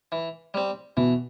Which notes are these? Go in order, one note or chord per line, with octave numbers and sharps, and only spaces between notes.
E3
G3 C4
B2 E3